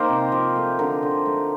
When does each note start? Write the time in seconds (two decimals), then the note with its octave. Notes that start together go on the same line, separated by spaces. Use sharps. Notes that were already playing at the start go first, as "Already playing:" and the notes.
Already playing: D#3 A#3 G4 A#4 C5
0.09 C3
0.32 F3
0.56 A3
0.79 D3 A#4
1.03 D3
1.26 A3